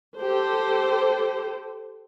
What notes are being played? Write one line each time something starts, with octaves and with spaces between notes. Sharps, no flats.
G4 A4 C5